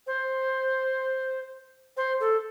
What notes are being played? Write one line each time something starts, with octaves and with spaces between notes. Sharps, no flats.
C5
C5
A4